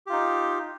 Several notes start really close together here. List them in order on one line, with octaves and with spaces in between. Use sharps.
G4 F4 D#4